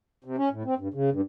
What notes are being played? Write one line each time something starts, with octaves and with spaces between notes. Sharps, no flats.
C3
C#4
A2
C4
G2
C#3
G2